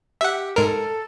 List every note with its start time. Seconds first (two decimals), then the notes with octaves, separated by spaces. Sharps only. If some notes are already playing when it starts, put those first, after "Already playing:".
0.21 G4 E5 F#5
0.56 G#2 A4 A#4